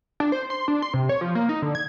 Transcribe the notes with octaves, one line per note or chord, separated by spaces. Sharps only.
D4
C5
C6
D4
C6
C3
C#5
F3
A#3
D#4
D3
G#6